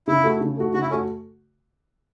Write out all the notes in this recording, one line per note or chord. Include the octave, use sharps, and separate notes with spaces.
C#3 E4
A3 F#4
C#3
A3 F#4
C#3 F#4
E4
A3 C#4 F#4